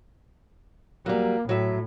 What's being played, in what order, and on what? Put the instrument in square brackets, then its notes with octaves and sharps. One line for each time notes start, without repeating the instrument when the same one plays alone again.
[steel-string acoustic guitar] F#3 G3 [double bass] A#3
[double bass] A2 [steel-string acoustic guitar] F#3 E5